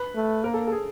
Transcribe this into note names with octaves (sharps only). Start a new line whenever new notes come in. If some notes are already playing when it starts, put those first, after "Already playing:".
Already playing: B4
A3
A#3 A#4
A4
A4
G#4